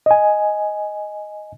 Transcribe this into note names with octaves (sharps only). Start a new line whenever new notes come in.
D#5 G#5